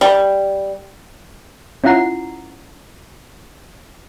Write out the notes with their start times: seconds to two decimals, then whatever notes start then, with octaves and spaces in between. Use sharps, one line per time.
0.01 G3
1.84 C#4 E4 F4 F#5 A#5 C7